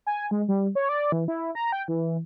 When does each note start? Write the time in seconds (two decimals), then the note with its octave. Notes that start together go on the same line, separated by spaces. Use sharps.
0.07 G#5
0.31 G#3
0.48 G3
0.75 C#5
0.89 D5
1.12 E3
1.28 E4
1.55 A#5
1.72 G5
1.88 E3